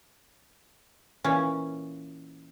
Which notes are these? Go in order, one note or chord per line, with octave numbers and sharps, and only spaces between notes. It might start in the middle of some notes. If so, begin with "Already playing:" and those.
A#2 E3 C#4